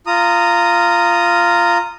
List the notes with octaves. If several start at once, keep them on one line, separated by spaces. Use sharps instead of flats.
F4 A#5 D#6